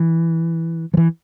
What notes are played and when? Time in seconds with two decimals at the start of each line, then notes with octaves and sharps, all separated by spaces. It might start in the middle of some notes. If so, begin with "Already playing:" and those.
Already playing: E3
0.94 F3
0.97 E3